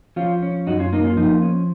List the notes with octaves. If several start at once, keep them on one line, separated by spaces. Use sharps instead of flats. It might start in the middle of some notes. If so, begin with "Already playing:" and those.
F3 C#4 F4
C#4
F#2 D#4 F#4
C#4 F4
A#3 D#4
C#4 F4
F3 D#4
C#4